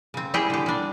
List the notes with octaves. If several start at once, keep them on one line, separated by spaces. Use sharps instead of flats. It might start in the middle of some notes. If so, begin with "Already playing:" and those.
C#3 C4
G3 E4 G4 G#4 G5
D3 G4
G3 D4